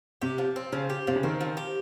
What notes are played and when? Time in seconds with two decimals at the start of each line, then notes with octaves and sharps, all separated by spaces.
0.22 C3 G4
0.38 F3
0.56 C4
0.73 C#3 F3
0.90 G4
1.07 C3 F3
1.16 C#3
1.23 D#3 C4
1.41 F3
1.57 G4